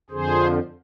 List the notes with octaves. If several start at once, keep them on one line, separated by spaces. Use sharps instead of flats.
F2 D3 F3 G#4 C5